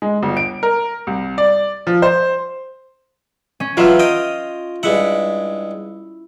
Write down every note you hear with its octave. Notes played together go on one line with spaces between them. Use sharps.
G#3
G1
D7
A#4
C2
D5
F3
C5
C#4
E3 F#3 F4 B4 E5 F6
D#5 G5 D#7
G2 G#3 E4 F#5